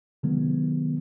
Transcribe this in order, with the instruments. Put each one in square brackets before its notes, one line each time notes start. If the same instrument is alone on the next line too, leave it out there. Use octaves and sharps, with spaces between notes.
[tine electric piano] C3 D#3 F#3 G#3 B3